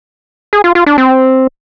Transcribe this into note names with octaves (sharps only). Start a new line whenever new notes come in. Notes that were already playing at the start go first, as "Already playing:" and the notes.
G#4
F4
F4
D4
C4